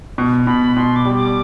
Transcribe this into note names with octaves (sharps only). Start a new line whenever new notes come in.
B2
B2 B5
B2 C6
D6
G3
D6